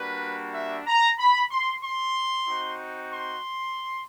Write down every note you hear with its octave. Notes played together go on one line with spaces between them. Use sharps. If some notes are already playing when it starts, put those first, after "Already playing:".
Already playing: G3 A#3 D4 F#4 B4
E5
A#5
B5
C6
C6
C4 D#4 F#4
C6